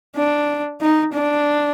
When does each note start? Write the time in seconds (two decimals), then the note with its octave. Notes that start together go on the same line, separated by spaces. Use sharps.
0.15 D4
0.81 D#4
1.13 D4